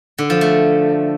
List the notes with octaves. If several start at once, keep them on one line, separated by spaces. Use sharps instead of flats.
D3
F3
A3